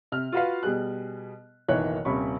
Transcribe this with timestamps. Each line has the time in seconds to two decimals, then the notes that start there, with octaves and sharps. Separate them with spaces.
0.12 C3 F6
0.32 F4 F#4 B4 F5
0.63 B2 G3 G#4 F#6
1.68 F#1 B1 D#3 E3 C#5 F#6
2.05 D#1 C3 C#4 B5 C#6